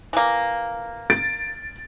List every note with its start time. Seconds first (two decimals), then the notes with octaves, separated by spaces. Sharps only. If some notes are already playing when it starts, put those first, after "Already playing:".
0.13 E3 A#3
1.10 A6 D7